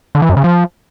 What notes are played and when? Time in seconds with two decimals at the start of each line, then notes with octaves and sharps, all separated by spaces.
0.15 D3
0.22 E3
0.29 F#2
0.37 C#3
0.44 F3